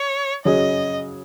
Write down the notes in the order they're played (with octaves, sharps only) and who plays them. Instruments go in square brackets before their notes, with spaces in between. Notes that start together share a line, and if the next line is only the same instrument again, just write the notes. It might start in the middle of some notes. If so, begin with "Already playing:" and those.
Already playing: [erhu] C#5
[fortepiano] C#3 F#3 C#4 G#4 [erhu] D#5